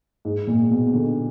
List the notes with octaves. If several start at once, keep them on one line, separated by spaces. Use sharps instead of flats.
G#2
A#2
B2
D3